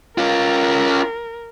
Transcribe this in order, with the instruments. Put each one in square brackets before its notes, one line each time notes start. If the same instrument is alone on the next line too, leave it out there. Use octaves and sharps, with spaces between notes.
[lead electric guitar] C#4 F4 [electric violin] A#4